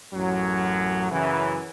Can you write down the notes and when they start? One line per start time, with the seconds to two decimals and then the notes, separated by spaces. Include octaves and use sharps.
0.14 A1 F#2 F#3
1.12 F#2 C#3 E3